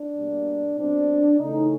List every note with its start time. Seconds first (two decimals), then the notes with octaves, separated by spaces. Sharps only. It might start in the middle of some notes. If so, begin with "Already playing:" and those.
Already playing: D4
0.17 B2 G3 A#3
0.78 B2 G3 C4 D4
1.38 C#3 E3 A3 C#4 D#4